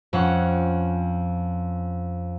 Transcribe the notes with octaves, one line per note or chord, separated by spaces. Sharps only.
F2 C4 C#4 F#5